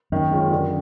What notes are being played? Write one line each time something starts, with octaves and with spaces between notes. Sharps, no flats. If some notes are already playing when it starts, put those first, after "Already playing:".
F#2 D#3
G#3 C#4 F4
D3